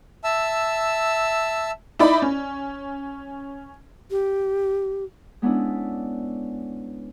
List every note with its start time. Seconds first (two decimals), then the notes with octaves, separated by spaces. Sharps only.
0.24 E5 A5 E6
1.99 D#4 E4 D5 B5
2.22 C#4
4.11 G4
5.42 G#3 B3 C#4 D4 E4